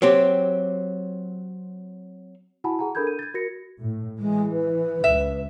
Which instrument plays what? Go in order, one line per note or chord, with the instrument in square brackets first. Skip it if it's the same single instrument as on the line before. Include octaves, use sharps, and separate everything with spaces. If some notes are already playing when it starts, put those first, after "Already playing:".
[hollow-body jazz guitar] F#3 C4 G4
[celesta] E4 F#4 F#5 G#5 A5 B5
G#4 F#5 G#5 A#5
D4 A4 A#4 B5 G6 G#6
D#7
G#6 A6
F#4 A#4 A#6 C#7
[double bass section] A2
[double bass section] E3 [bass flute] G#3
[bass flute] B4
[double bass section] C#2 [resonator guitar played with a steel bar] E5